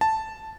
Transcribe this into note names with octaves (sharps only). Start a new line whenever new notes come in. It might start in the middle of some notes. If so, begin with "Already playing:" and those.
A5